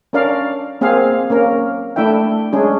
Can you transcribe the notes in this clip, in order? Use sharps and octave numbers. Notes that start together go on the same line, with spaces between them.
C#4 D4 A#4 D5 F5
A#3 C4 G#4 A#4 F5
A#3 C#4 A#4
A3 D4 E4 E5 G5
G#3 C#4 D4 G#4